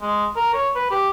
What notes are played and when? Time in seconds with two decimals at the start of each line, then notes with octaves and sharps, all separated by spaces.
0.02 G#3
0.36 A#4
0.54 C#5
0.76 B4
0.91 G4